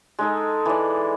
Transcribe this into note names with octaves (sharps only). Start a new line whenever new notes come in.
G#3 D#4 A4
E3 D5